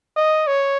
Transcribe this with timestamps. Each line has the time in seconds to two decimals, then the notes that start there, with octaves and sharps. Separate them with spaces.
0.16 D#5
0.47 C#5